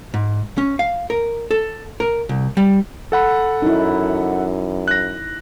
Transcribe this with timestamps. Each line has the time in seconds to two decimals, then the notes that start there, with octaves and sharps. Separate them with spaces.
0.14 G#2
0.58 C#4
0.79 F5
1.10 A#4
1.51 A4
2.00 A#4
2.29 C2
2.57 G3
3.12 A4 F#5 B5
3.62 F#2 D#4 E4
4.88 F#6 A#6